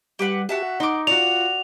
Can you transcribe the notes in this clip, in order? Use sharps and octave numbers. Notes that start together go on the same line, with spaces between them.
G3 G4 B4 F#5
F#4 G4 E5 A5
F#5
D#4 C6 D6
F4 F#4 D5 C#6 F7